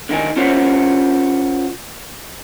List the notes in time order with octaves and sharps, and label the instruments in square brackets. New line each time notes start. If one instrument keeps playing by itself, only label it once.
[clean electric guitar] D3 D#3 D#4 A#4 G#5
C#4 F4 F#4 A#4 C5 C#5